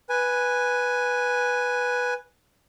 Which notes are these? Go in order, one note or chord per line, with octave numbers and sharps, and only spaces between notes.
B4 G#5